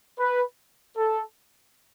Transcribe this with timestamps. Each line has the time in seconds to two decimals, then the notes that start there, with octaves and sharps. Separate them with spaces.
0.19 B4
0.97 A4